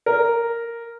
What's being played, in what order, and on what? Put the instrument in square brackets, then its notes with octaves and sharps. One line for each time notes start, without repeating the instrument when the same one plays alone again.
[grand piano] A#4